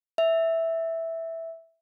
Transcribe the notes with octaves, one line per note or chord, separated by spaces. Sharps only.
E5